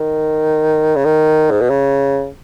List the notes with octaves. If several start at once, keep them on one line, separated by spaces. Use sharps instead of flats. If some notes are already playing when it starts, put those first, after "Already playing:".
Already playing: D#3
C#3
D#3
G#2
B2
C#3